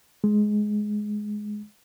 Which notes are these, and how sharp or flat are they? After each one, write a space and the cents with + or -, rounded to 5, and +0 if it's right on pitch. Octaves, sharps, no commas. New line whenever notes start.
G#3 +10